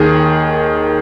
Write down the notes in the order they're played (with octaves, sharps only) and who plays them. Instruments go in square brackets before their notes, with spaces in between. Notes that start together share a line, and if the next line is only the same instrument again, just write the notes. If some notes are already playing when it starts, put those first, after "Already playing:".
Already playing: [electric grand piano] D#2 D#3 G#4